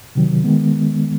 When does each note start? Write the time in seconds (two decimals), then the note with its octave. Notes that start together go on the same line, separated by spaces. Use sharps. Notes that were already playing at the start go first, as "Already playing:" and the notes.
0.15 C3 D#3 F#3
0.44 D#3 G#3 B3